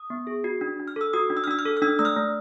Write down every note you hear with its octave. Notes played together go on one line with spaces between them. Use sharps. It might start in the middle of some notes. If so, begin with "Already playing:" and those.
Already playing: D#6
B3
G#4
F#4
D4
D4
F6
A4 E6
F#4 D#6
D4
E6
F6
D4 E6
F6
A4
F6
D4 E6
A3 E6
F6
A3